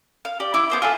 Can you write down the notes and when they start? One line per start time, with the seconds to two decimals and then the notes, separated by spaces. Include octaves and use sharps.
0.25 F5
0.40 G4 D5
0.54 E4 D6
0.70 B3 C5 D6
0.82 F4 G#4 A4 E5